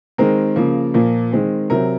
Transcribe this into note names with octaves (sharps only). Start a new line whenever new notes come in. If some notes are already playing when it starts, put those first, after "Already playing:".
D#3 G#3 C4 A#4
C#3 F3 A#3
A#2 F3 A#3
D#3 G#3 C4
C3 F#3 C4 A#4